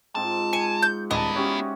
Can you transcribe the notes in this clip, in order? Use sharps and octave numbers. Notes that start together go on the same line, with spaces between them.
G#2 C4 F4 A5
G#5 C#7
G6
D#1 B3 E4 D5 D#5 A5 A#5
C#4 F#4 G4 E5 F#5